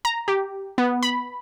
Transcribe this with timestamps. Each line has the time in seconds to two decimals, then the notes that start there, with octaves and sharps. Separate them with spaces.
0.05 A#5
0.28 G4
0.78 B3
1.03 B5